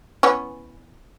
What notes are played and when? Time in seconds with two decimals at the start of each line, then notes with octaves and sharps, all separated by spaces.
0.23 E3 B3 C#4